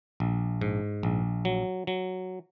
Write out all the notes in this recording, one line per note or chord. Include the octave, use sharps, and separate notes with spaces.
A#1
G#2
A#1
F#3
F#3